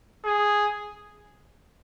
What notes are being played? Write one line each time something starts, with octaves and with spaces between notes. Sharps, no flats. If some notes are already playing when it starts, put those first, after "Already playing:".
G#4